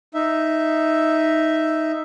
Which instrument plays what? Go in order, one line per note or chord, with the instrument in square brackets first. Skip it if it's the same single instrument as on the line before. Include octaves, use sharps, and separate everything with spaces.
[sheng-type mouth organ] D#4 E5